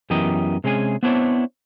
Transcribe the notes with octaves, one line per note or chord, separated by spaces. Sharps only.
F#2 E3 B3 G4 A#4 D#5
C3 G#3 C#4 G#4 G#5
B3 C4 D4 E4 C5 C#5